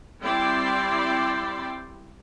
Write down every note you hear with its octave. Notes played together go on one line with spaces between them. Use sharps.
G3 C4 E4 D5 G5 C6